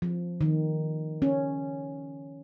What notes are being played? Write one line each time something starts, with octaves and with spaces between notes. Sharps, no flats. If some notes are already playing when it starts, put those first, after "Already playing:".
F3
D#3
C#4